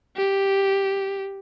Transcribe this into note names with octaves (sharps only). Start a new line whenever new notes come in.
G4